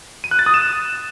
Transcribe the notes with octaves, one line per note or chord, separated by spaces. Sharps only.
D#7
F#6
A6
D#6
E7